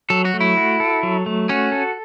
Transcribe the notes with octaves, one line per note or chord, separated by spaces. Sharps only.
F#3 A4
F#4
A3
E4
F#4
A4
F#3
A3
C#4 F#4
A4